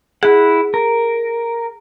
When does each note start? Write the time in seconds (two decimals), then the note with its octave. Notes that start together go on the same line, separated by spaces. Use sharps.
0.23 E4 G#4 F#5
0.74 A#4